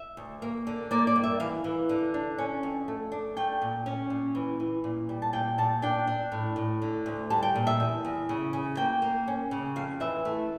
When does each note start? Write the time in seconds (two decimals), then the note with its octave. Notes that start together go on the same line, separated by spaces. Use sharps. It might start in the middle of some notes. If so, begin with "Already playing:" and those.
Already playing: E5
0.17 D2
0.42 A#3
0.67 D3
0.91 A#3 D5
1.07 D5
1.16 G2
1.24 E5
1.40 E3 F5
1.64 E3
1.89 D3
2.14 D4
2.38 C#4
2.63 F2
2.88 A3
3.12 D4
3.37 A3 G5
3.62 A#2
3.86 C#4
4.10 A#2
4.35 E3
4.60 E3
4.84 A#2
5.09 G3
5.22 A5
5.33 A#2 G5
5.58 A#2 A5
5.82 D4 G5
6.07 D4
6.32 A2
6.56 A2
6.82 D3
7.06 D2
7.30 G3 A5
7.43 G5
7.55 A#2
7.67 E5
7.80 E2
8.05 E2
8.29 C#3
8.53 C#3
8.77 A#3 G5
9.02 A#3
9.28 C#4
9.51 C#3
9.76 F2 F5
10.00 E3 E5
10.25 A3